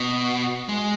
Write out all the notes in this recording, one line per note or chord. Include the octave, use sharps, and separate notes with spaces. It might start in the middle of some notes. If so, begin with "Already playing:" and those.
Already playing: B2
G#3